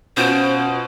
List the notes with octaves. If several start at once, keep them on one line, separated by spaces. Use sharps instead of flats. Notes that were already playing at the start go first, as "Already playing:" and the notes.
B2 C#4 F4 C5 F#5 D7